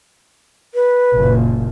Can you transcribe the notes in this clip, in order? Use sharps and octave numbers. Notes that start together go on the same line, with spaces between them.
B4
F#1 A#2